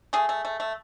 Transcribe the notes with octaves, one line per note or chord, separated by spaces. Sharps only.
A3 G#4
A3
A3
A3